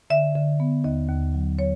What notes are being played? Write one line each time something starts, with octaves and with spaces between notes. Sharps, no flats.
D3 E5
D3
B3
D#2 D#5
D#2
F#3
F#3 C#5